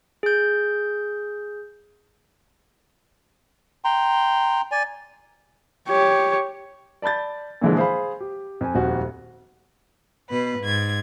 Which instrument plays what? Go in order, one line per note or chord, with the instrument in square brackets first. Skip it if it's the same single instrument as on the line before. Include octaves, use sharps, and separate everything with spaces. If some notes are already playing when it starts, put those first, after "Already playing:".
[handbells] G#4 G6
[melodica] G5 A#5 C6
D5 G#5
[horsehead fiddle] G4 C#5
[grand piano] D5 A5 B5 G6 A6
A#2 D3 E3 F3 G#3
G#4 C5 F5 B5
G4
F2 G#5
D#1 F2 F#4
[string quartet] B2 B4
G#2 G#6